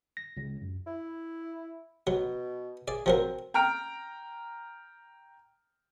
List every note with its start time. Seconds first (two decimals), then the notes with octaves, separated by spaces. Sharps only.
0.17 A#6
0.37 C#2
0.62 F#2
0.87 E4
2.07 B2 F#3
2.88 G#4 D5
3.06 F3 F#3 C4 A#4
3.54 G5 A#5 F6 D7